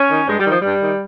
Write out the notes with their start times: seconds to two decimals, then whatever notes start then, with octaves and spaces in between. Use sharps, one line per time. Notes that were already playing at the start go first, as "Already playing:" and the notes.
Already playing: C#4
0.10 D#3
0.28 G2 G#3
0.39 G3
0.46 D#3 F3
0.61 G2 G3
0.82 D#3